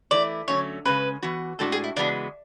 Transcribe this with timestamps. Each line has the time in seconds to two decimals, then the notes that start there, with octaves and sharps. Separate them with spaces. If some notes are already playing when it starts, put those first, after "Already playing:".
0.11 E3 A3 E4 D5
0.48 D3 F#3 A3 C#4 C#5
0.85 C#3 G#3 C#4 B4
1.22 E3 B3 F#4
1.59 A2 G#3 D4 F#4 A4
1.72 G#4
1.84 E4
1.97 C#3 E3 G#3 B3 D4 F#4